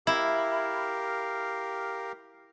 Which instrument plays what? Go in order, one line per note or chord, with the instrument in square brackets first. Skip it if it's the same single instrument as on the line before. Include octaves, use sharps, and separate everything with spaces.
[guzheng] E4 [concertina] G4 A#4 F5